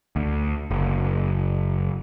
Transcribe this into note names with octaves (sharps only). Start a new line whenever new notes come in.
D2
F#1